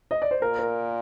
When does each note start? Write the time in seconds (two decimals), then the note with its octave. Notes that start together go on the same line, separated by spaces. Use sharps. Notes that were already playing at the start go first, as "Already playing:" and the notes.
0.11 D#5
0.22 D5
0.31 C5
0.42 A#2 A#4
0.59 A#4